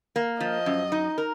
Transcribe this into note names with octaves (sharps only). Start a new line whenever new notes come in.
A#3
F3 D#5
F#2
D#4
A#4